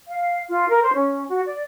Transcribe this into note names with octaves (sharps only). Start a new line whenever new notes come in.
F5
F4
A#4
C5
C#4
F#4
D5